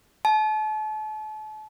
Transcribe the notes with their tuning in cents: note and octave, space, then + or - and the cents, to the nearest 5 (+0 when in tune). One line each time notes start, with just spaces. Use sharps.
A5 -40